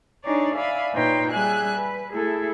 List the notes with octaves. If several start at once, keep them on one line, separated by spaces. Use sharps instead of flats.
D4 D#4 G#4 C#5 D5
D5 E5 F5 G#5 B5
A#2 D#4 B4 C#5 G5 C6
G3 G#4 E5 G#5 F#6
B4
A3 E4 G#4 A4